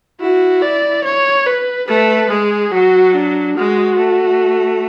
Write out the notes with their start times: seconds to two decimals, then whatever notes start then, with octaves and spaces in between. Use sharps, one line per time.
0.21 E4 F#4
0.62 D5
1.05 C#5
1.47 B4
1.88 A3 B4
2.30 G#3 G#4
2.72 F#3 F#4
3.15 D4
3.57 G#3 F#4
3.99 A3